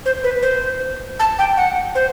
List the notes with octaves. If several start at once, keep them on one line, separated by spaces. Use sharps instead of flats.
C5
B4
C5
A5
G5
F#5
C5